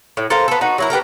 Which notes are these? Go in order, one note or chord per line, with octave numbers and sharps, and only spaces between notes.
A2
A4 A#4 C5 F5
B3 A4
D#4 F#4
F#3 E4 A#4
B3 G4 A4 A#4